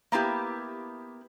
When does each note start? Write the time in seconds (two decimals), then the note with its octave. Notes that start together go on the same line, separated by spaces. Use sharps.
0.12 A#3 B3 E4 G4